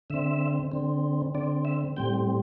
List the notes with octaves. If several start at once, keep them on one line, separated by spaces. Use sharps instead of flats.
D3 C4 E5
D3 C4
D3 C4 D5
E5
A2 G3 C4 G5